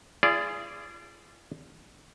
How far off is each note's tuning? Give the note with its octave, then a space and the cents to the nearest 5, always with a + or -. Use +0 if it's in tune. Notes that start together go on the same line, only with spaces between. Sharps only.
F4 -45 G#4 +0 D5 -5